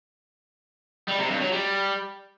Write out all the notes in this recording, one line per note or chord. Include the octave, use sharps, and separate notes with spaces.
G3
C3
G2
F#3
G3